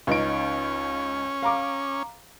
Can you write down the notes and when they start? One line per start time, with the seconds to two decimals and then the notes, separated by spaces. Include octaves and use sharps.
0.07 C#2 C#4 D#4 D7
1.42 F5 A#5 D6